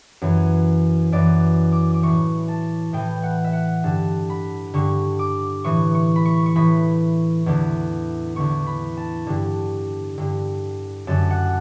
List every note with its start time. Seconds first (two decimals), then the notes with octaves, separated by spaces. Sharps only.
0.22 F#2 E3
1.12 F#2 E3 D5
1.72 D6
1.94 D6
2.03 A2 E3 C#6
2.48 A5
2.93 A2 E3 G5
3.23 F#5
3.44 E5
3.53 F#5
3.84 G2 D3 A5
4.30 B5
4.74 G2 D3 C#6
5.19 D6
5.64 A2 E3 C#6
5.95 C#6
6.16 B5
6.25 C#6
6.46 C#6
6.55 A2 E3 B5
7.46 E2 D3
8.36 E2 D3 C#6
8.67 B5
8.97 A5
9.27 G2 D3
10.18 G2 D3
11.07 F#2 D3 A5
11.30 F#5